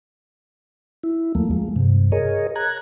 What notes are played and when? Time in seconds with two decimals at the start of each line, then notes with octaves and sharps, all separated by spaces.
1.03 E4
1.35 D#2 F3 A3 A#3
1.51 F3 G#3
1.76 G2 C3
2.12 G#4 A#4 C#5 D#5
2.56 A#5 F#6 G#6